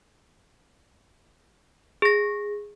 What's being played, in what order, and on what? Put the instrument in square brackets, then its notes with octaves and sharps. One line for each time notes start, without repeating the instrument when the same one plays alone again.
[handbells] G#4 A#6